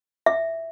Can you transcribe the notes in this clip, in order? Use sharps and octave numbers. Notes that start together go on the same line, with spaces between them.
E5